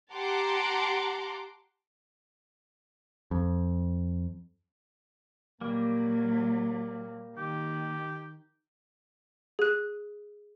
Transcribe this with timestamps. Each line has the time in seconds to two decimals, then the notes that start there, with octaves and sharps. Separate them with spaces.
0.13 G4 F#5 A5 A#5 C6 D6
3.31 F2
5.61 A#2 F#3 G3 A#3
7.37 D#3 G4
9.59 G#4 F#6